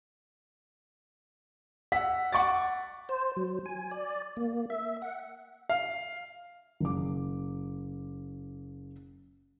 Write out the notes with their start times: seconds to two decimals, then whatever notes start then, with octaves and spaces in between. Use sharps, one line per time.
1.92 F#5 E6 B6
2.33 F#5 C#6 D6 A6
3.09 C5
3.37 F#3
3.66 G#5
3.91 D5
4.37 A#3
4.70 E5
5.02 F#5
5.69 F5
6.80 F#1 D6